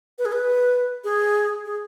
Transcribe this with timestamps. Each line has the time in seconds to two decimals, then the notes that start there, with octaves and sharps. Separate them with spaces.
0.18 B4
0.25 G#4
0.32 B4
1.04 G#4
1.66 G#4